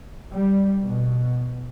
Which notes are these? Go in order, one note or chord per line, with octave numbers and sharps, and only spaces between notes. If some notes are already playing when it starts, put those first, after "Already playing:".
G3
B2